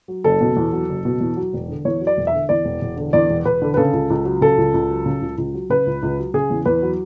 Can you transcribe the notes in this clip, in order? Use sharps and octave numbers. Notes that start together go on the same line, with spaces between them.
F#3
F#1 A4
B2
E2
F#3
F#1
B2
E2
F#3
E1
D3
E2 C#5
F#3
D5
E1
E5
D3
E2 D5
E1
E1
D3
E2 D5
E1
E1 B4
D3
B4
C#3 A4
C#2
C#2
F#3
C#3 A4
C#2
C#2
F#3
C#3
C#2
C#2
F#3
C#3 B4
C#2
C#2
F#3
C#3 G#4
E2
E2 B4
F#3